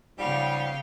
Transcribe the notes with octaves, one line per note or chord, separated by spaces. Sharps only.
G#2 C#3 F3 G3 G4 F5